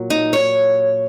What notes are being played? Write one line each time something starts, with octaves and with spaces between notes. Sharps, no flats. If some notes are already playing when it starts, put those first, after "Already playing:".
Already playing: A#2 F#3
D#4
C#5